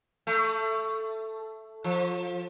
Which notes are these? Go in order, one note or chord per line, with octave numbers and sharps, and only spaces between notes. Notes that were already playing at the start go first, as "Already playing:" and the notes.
A3
F3